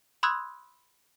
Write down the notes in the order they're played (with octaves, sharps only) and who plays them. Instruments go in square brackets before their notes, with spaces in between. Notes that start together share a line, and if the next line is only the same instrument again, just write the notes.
[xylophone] B5 C6 D#6 E6 F#6 G#6